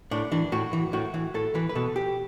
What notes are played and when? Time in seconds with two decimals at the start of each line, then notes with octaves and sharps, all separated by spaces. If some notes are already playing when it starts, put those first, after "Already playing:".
0.11 A2 D4
0.32 E3 D4
0.52 A2 F#4
0.73 E3
0.93 A2 F#4
1.14 E3
1.34 A2 A4
1.55 E3 B4
1.69 B4
1.75 B2 A4
1.96 G4